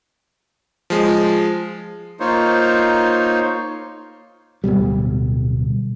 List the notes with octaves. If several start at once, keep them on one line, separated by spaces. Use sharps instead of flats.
F3 G#3
A#3 D#4 F4 C5 C#5
D1 A#1 B2 G3